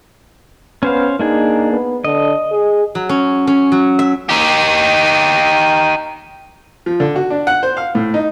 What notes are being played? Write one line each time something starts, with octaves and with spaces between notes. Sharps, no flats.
B3 C#4 C5 F5
A#3 D4 D#4 G#4
B3
D3 D#5
G#4
F#3
C#4
C#4
F#3
E5
D#4 G4
F3
D3
F#4
D4
F#5
C5
F5
A2
D#4